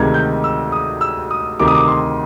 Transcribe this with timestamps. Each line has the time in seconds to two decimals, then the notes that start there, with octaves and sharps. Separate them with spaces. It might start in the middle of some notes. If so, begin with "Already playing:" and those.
Already playing: D2 C3 D#3 G#3 G#6
0.14 G6
0.44 E6
0.72 D#6
1.01 E6
1.31 D#6
1.60 D2 C3 D#3 D6
1.68 D#6
1.75 D6
1.88 C6